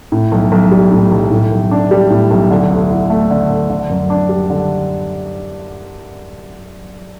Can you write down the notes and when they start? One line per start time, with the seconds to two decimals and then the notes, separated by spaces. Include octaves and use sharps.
0.12 A2
0.32 B1
0.52 B1
0.71 G3
0.92 A2
1.11 B1
1.31 A2
1.51 B1
1.71 D4
1.91 G3
2.10 A2
2.31 B1
2.51 D3
2.70 D2
2.91 E4
3.10 A3
3.31 D3
3.50 D2
3.70 D3
3.90 F#2
4.10 D4
4.29 G3
4.50 D3